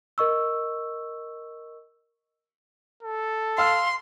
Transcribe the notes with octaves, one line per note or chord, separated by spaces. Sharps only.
A#4 D#5 C#6 E6
A4
F5 C6 E6 F6